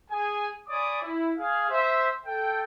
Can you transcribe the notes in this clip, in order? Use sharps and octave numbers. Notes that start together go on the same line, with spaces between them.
G#4 G#5
C#5 D5 G#5 B5 D6 D#6
E4
G#4 F5
C5 E5
A4 G5